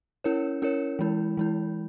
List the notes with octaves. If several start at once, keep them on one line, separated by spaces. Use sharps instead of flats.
C#4 E4 A#4 C#5
C#4 E4 A#4 C#5
E3 G#3 E4
E3 G#3 E4